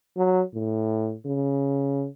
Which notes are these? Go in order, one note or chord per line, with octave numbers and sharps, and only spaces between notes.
F#3
A2
C#3